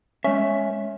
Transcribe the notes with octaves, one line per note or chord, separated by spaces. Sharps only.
G#3 C#4 E5